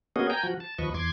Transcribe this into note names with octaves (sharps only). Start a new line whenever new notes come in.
A#3 B3 C#4 F#4 G#4 D#5
G5 G#5 A#5 G6
F3 F#4
A5
D#2 F3 B4 D#5 C#6
E2 C6 D6 G#6